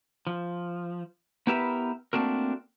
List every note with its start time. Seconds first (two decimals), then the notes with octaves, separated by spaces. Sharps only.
0.27 F3
1.47 B3 E4 G4 A#4 B4 E5
2.13 A3 A#3 C4 D4 F#4 A#4